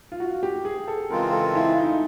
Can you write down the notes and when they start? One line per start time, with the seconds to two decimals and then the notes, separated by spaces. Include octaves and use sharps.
0.12 F4
0.20 F#4
0.43 G4
0.65 G#4
0.88 A4
1.10 C#3 E3 G#3 C4 F4 A#4
1.33 A4
1.55 E4
1.78 D#4